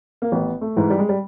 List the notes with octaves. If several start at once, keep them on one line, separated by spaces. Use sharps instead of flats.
A#3
A1 B3
A3
G#2 E3
G3
G#3
G3